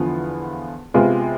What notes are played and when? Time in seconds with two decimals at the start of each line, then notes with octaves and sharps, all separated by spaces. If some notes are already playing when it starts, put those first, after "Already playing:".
Already playing: E2 D3 F3 B3 F4
0.94 C3 G#3 B3 F4